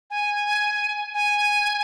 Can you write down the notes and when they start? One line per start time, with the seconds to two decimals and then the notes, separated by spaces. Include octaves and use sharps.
0.10 G#5
1.14 G#5